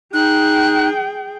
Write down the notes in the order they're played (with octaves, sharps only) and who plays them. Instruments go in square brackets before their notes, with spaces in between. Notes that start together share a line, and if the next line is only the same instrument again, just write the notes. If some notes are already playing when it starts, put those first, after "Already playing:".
[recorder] D#4 [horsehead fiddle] G#4 G5 [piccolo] F#6